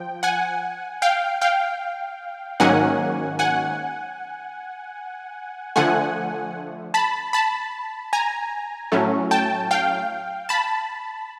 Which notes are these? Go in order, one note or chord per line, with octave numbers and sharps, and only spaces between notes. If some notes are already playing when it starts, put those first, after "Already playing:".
Already playing: F3 G5
F#5 G#5
F5 G5
F5 G5
G#2 D#3 F#3 A#3 C#4 F#5 G#5
F#5 G#5
D3 F3 A3 F#5 G#5
A5 B5
A5 B5
G#5 A#5
A2 F#3 A3 C#4
G5 A5
F5 G5
A5 B5